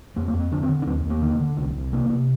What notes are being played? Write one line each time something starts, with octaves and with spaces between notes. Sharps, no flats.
F2 A#3
A#3
F2
C4
D3 D4
C4
D3
D4
D#2 C4
D#2
A#3
D3
D3
C2
C2
C3 A#3
C3